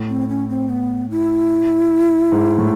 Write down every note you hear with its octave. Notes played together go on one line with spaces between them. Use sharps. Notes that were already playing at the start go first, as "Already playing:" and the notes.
Already playing: A2
C4
C#4
C4
B3
E4
G#2
A2